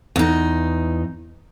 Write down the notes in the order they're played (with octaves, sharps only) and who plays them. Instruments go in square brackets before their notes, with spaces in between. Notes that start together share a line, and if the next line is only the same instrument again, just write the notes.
[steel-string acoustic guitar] E2 D#4